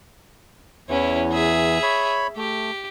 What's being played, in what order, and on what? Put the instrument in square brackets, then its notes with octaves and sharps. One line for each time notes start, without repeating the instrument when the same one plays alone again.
[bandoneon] E2 E3 [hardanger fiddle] C#4 E4
[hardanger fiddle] G#4 E5
[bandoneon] C#5 B5
[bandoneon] A3 [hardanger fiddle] G4